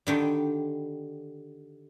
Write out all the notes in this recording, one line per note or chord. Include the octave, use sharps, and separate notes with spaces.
D3 D#3 G3